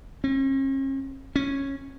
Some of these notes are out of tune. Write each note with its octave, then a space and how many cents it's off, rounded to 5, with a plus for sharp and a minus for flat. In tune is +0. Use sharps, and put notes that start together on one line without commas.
C#4 -45
C#4 -10